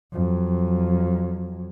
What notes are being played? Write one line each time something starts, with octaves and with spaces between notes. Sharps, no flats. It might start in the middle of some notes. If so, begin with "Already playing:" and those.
F2 F#3